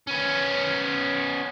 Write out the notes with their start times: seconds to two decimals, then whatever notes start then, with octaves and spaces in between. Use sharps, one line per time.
0.07 B3 C#4